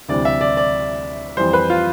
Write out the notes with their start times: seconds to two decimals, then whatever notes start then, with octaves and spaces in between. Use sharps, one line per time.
0.09 D2 C3 E3 G3 D5
0.25 E5
0.41 D5
0.57 D5
1.37 F2 E3 G3 C5
1.53 B4
1.70 F4